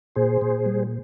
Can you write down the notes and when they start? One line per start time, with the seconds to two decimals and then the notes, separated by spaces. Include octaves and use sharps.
0.16 A#2 G#4 C5
0.41 A#2
0.66 G3